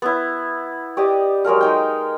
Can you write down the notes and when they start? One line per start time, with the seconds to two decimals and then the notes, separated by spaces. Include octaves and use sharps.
0.02 B3 E4
0.97 G4 D5 D#5
1.44 F#3 G#3 A#4 F5
1.61 G#3 D#4 G5